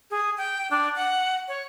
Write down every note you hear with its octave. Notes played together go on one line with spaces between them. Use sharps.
G#4
G5
D4
F#5
C#5